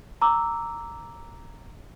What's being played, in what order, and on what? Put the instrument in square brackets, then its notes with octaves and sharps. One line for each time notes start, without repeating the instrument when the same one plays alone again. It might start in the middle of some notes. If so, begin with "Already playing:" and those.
[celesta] A#5 D6 E6